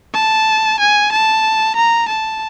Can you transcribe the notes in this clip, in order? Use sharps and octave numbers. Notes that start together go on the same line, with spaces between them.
A5
G#5
A5
A#5
A5